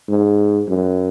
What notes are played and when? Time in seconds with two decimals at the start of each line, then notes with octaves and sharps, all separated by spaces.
0.08 G#2
0.68 F#2